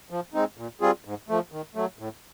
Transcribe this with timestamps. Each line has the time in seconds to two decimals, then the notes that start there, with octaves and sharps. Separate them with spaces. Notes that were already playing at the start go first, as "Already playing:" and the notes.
0.10 F3
0.34 G#3 C4 D#4
0.57 A#2
0.81 G3 C4 F4 G#4
1.05 G#2
1.29 F3 A3
1.52 D#3
1.75 F#3 A3
1.99 A2